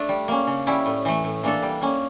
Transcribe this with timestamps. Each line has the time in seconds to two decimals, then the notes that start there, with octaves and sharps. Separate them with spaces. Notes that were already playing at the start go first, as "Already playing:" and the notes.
Already playing: A3 D4
0.09 G3
0.28 A#3 C#4
0.47 C#3
0.67 G3 C#4 E4
0.86 A2
1.05 E3 A3
1.24 A2
1.43 E3 A#3 D4 A4
1.63 G3
1.81 A#3 C#4